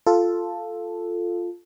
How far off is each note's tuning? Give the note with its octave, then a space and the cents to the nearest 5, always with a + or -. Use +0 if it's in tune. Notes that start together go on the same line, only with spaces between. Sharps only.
F4 +0 A4 +0